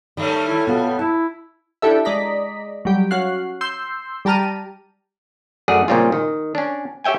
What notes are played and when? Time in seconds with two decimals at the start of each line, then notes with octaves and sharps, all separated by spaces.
0.17 D#3 G3 A3 C#4
0.45 E4
0.67 B2 B3 F4 A4
0.99 E4 A5
1.82 D4 E4 G4 A4 E5
2.05 G#3 D5 D#5 A#5 B6
2.85 F#3 G3 G4
3.11 C#4 F#4 C#5 F5 F#6 C7
3.61 C6 E6 G6 C7
4.25 G3 G4 A5 A#5 F6 D#7
5.68 F#2 A3 G#4 D5 F#5
5.88 A#2 C#3 G3 C4 F4
6.12 D#3
6.55 C#4 D4
7.04 G4 C#5 E5 G5 G#5